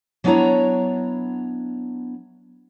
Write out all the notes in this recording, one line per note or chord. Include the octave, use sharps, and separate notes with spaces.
F#3 B3 D4 E4 C#5 A#5